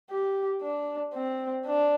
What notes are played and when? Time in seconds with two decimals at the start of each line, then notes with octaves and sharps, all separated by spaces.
0.10 G4
0.62 D4
1.14 C4
1.67 D4